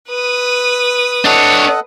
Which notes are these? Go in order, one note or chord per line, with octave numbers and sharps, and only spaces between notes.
B4 D#6
D4 A4 C#5 D#5 F#5